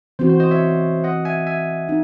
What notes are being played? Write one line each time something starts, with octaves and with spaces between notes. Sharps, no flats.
E3 C4 F#4 C5
C5
C5 D#5
C#5 E5
D#5 F#5
E5 G#5
E5 G#5
D#4